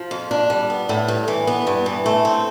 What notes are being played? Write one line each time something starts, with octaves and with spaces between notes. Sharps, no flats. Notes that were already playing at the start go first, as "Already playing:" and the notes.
Already playing: F3
F2
D4
G3
B3
A2
G2
E3
B3
G2
E3
A3
C4